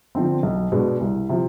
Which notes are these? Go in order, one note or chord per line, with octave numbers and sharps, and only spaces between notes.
D3 F3 C4
B1
B2 G#3 D4
C2
C3 F3